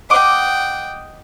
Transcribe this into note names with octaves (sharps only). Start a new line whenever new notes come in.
D#5 F#5 G5 D6